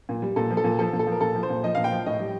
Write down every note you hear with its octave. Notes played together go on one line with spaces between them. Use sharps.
A#2
G3
A#2 A4
F3
A4
A#2
F3 A4
A#2
A4
F3
A#4
A#2 A4
F3
C5
A#2
F3 D#5
A#2 F5
G5
F3
A2 D#5
G3